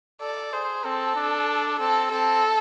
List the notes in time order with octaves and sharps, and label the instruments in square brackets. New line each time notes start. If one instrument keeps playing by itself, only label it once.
[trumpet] A4 [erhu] D5
[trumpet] G#4 [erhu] C5
[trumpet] C4 [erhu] A4
[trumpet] D4
[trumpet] C4 [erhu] A4
[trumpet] C4 [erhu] A4